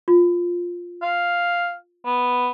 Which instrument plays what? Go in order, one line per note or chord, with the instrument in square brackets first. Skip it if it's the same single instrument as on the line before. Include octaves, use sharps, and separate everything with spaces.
[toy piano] F4
[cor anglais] F5
B3